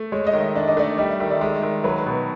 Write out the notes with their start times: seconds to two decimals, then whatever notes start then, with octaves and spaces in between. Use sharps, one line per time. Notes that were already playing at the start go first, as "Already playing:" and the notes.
Already playing: A3
0.12 G#3 C#5
0.27 D#5
0.33 D#3
0.41 E5
0.55 D4 D5
0.68 D#5
0.77 A3 D5
0.98 G3 D#5
1.09 E5
1.20 D#3 E5
1.31 D5
1.41 G#3
1.62 D#3
1.84 F#3 B4
2.06 B2